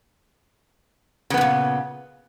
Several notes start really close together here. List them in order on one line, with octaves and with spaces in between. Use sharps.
C#3 B3 G2 A#2